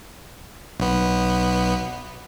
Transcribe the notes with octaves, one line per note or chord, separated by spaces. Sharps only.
B1 B3